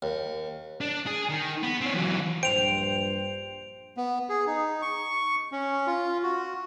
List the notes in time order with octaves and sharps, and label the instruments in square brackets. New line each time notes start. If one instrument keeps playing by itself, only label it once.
[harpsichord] D#2
[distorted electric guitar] D4
G#4
D#3
B3
C4 C#5
E3 F#3
[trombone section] A#1 G2 [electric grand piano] C5 G5 [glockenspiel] D7 F7
[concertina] B3
G#4
D#4
C#6
C#4
F4
F#4